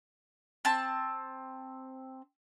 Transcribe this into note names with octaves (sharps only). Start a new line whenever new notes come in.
C4 A5